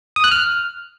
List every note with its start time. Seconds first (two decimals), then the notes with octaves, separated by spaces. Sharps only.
0.16 D#6
0.24 F#6
0.32 F6